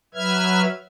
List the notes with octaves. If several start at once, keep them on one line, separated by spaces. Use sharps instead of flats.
F#3 B4 E5 F6 G#6